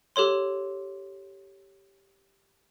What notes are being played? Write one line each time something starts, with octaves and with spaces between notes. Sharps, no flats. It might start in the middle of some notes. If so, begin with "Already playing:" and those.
G4 A4 C#5 C6